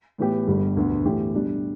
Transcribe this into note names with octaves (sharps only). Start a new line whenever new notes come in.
A2 E3 B3 G4
G1 G2 G3
E1 D2 D3 B3
A2 E3 A3 G4
B2 G3 D4